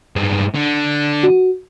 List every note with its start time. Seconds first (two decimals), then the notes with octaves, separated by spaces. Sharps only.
0.16 G2 G#3
0.55 D3
1.23 F#4